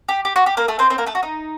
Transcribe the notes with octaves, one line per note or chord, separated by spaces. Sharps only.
G4
G4
F#4
G4
A#3 A#4
A3 A4
C4 C5
C4 C5
A#3 A#4
A3 A4
F#4
D#4